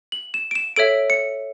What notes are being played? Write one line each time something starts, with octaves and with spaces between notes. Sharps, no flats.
F#7
E7
D7
E7
A4 C#5 E5 D7
C#7